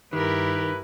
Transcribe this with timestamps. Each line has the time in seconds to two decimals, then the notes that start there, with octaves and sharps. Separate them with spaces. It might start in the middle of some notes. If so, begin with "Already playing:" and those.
0.13 G2 D#3 E4 G4 A#4 B4